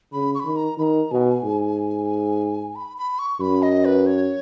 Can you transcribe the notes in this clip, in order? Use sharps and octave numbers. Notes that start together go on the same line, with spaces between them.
C#3 B5
C#6
B5
D#3
A#5
D#3 A#5 B5
B2 G#5
G#2
B5
B5
C#6
F#2 B5
D#5
B4
C#5